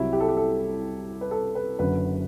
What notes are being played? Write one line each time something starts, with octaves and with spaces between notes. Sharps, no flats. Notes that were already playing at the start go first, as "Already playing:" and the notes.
Already playing: C2 C3 F#3 E4
G4
A4
G4
A4
B4
A4
B4
F#1 F#2 D3 F#3 B4